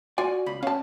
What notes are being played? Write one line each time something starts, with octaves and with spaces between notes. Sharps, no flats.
F4 F#4 D5 G#5
C#2 B5
C#4 F5 A5